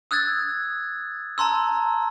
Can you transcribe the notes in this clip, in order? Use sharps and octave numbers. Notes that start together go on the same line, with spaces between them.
D#6 E6 F#6 G#6 A6
A5 A#5 C6 E6